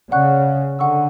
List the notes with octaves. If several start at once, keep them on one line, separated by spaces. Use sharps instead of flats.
C#3 D5 F#5 C#6 F#6
D3 F#5 C#6 E6